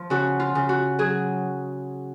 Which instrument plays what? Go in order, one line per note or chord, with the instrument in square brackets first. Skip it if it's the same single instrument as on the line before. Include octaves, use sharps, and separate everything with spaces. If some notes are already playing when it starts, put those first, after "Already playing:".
Already playing: [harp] F3
C#3 F#4
F4
C#3
F#4
F#3 G#4